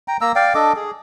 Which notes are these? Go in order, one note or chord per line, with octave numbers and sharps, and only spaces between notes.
G5 A#5
A#3 A#5 E6
D5 F5 G5
D4 A4 D#5 D6
G#4